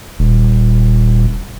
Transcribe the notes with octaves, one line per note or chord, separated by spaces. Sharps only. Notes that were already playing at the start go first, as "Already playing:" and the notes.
D#1